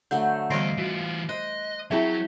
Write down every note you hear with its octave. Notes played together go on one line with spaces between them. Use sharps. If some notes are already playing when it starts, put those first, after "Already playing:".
D3 F#3 A3 G6
D2 E3 G3 B3 D#5 F5 C7 D7
E3 F4 F#4
C5 D#5 F#6
F#3 C4 E4 G#4 E5 G5 B5